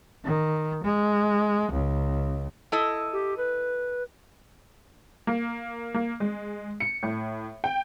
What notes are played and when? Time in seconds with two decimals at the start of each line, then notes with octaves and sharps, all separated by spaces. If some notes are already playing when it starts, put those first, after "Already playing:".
0.25 D#3
0.84 G#3
1.72 C#2
2.72 E4 A4 D#5
3.13 G4
3.38 B4
5.27 A#3
5.94 A#3
6.20 G#3
6.80 C#7
7.03 A2
7.64 G5